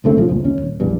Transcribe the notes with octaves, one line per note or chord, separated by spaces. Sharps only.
C#2 D3 A3 C4
B1 G#2 F3
C#2 G2 A#2
D#2 C#4
D#1
A#1 E2 G2